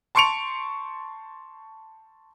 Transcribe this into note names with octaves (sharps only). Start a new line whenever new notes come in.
A5 C6 C#6 C#7 D7 F7